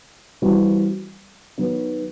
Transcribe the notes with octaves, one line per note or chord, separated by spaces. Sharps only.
E3 G3 C4 F#4
D#3 F#3 B3